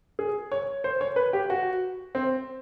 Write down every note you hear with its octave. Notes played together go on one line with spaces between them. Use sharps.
G#4
C#5
C5
C#5
B4
G4
F#4
C4